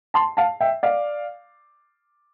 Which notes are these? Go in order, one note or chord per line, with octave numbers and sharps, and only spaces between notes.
A5 C6
F5 A5
E5 G5
D5 F5